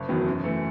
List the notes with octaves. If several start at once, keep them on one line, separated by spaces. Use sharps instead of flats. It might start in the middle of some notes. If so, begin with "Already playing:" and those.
Already playing: F#1
E2 D#3 F#3 B3
F#2
E3 A3